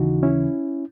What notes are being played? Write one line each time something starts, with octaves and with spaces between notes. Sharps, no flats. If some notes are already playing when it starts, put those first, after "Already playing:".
Already playing: D#2 C#3 E3 D#4 F#4
C#4 E4